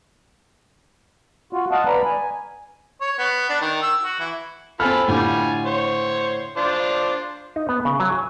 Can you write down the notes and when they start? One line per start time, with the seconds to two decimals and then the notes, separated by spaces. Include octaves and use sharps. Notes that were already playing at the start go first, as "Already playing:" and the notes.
1.53 F4 F#4
1.71 D#5 F5 F#5 A5
1.87 B4 D5 A#5 B5
2.05 G#5
3.01 C#5
3.18 B3
3.49 D4
3.61 D#3
3.82 E6
4.02 F#4
4.19 E3
4.80 C4 F4 A4 G#5 B5 F6
5.08 A2 D3 G3 F4 G#5
5.66 C5 C#5
6.57 D4 F4 C5
7.56 D#4
7.69 B3
7.85 C#3
8.00 F#3
8.13 G#5